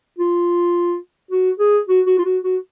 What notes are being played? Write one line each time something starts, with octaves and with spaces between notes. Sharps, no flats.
F4
F#4
G#4
F#4
F#4
F4
F#4
F#4